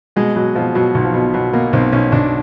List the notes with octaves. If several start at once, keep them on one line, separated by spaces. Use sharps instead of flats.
B2 G#3
B2 F#3
B2 F3
B2 F#3
B1
F3
B2
B2 F#3
B2 A#3
B1 C4
B1 C#4
B1 D4